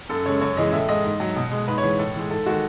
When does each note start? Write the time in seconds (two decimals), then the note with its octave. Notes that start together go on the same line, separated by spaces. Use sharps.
0.09 F#2 A4
0.26 C#3 G#3 C#5
0.41 F#2 C#5
0.57 C#3 E3 G#3 D#5
0.73 A2 E5
0.88 G#3 D#5
1.05 G#2
1.20 F#3
1.36 B2
1.52 G#3
1.68 G#2 B4
1.78 C#5
1.83 E3 G#3
1.99 A2 A4
2.15 E3 G#3
2.30 G#2 A4
2.46 D#3 G#3 F#4